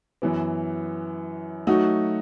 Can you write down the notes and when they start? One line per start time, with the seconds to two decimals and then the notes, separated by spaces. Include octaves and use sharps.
0.22 F#2 E3 B3
1.67 F#3 A3 D#4 F#4